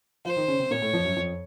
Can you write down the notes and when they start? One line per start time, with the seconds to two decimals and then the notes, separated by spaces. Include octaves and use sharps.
0.25 F3 F4 C5
0.36 D#3 D#4
0.48 C#3 C#4
0.59 C3 C4
0.71 A#2 A#3 C#5
0.82 A2 A3
0.93 F2 F3
1.05 F#2 F#3
1.16 F2 F3